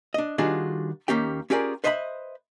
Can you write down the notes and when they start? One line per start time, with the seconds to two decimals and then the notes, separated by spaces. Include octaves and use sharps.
0.14 D4 D#5
0.38 D#3 G3 D4 F4 F#4 G#4
1.08 D#2 G3 A#3 C#4 G4 G5
1.50 C#4 F4 G4 G#4 A#4 D5
1.84 B4 C5 D#5 E5 A5 B5